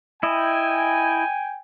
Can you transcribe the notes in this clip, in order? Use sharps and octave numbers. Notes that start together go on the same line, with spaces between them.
E4 D#5 G5 G#5